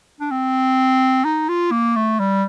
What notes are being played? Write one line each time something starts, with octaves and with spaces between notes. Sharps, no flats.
D4
C4
D#4
F4
A#3
A3
G3